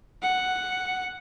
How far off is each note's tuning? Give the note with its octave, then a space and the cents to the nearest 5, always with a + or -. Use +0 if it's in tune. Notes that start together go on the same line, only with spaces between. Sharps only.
F#5 +0